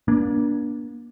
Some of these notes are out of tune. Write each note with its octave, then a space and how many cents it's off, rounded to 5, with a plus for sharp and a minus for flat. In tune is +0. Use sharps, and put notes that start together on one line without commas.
A#3 +40 D4 -10